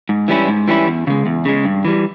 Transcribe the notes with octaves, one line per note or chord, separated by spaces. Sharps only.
G#2
E3 G3 C#4 E4
G#2
E3 G3 C#4 E4
E2
C#3 G#3
E2
C#3 G#3
G2
E3 G3